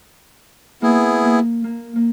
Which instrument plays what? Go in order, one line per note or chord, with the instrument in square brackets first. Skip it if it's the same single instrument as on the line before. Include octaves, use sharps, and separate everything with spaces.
[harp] A#3 [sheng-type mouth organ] B3 E4 G#4
[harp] A#3
A#3
A#3